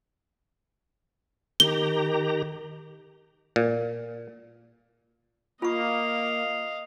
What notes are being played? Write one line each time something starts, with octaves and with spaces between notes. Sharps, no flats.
D#3 G4 A#5 G7
A#2
A#3 F4 D#5 F5 C#6